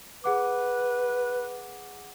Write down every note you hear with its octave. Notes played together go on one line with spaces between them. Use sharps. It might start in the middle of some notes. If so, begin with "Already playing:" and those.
G#4 B4 F#5 D6